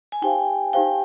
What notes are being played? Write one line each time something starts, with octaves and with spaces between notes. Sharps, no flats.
G#5
D#4 G4 C5 F5 G5
D#4 G4 C5 F5 G5